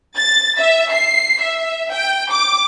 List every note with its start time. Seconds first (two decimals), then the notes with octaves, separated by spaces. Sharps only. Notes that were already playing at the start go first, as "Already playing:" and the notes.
0.17 A6
0.59 E5
0.93 C7
1.42 E5
1.91 G5
2.31 D6